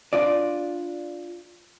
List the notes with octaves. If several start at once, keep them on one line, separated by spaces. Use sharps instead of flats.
D4 F4 D5